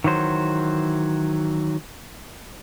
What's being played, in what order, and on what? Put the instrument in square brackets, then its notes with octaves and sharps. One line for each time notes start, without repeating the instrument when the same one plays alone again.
[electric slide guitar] D#3 E3 F#3 C5